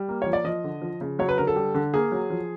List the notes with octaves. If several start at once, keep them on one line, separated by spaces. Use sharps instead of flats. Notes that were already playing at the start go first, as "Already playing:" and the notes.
Already playing: G3
A#3
F3 C#5
D5
F3 D#5
D3
F3
C#3
F#3 C#5
B4
D3 A#4
A4
G3
D3
A#3 G#4
F#3
F3